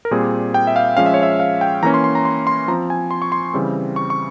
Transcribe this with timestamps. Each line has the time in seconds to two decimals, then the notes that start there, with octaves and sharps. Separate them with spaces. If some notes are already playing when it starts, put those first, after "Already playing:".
0.05 A#4
0.11 A#2 G3 C4 G#4
0.54 G5
0.67 E5
0.76 F5
0.97 F3 G#3 C#4 F5
1.06 E5
1.14 C#5
1.23 E5
1.40 F5
1.61 G5
1.82 E3 A#3 C#4 A#5
1.94 C6
2.04 C6
2.15 A#5
2.25 C6
2.47 C6
2.68 F3 A#5
2.71 C4
2.90 G#5
3.11 C6
3.22 C#6
3.32 C6
3.54 C#3 E3 G3 C4
3.96 C#6
4.10 C#6